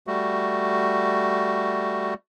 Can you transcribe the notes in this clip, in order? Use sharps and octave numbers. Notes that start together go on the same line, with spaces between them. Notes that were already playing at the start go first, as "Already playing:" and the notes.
G3 A3 F#4